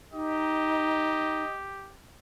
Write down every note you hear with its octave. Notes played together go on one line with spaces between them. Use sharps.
D#4 G4 D#5